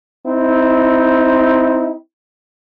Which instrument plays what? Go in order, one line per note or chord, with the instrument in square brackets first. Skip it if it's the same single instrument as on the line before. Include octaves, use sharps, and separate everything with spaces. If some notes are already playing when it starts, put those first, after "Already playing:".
[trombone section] C4 D#4 E4